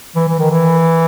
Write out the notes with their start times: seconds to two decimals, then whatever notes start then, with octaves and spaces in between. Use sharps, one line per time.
0.15 E3
0.28 E3
0.39 D#3
0.51 E3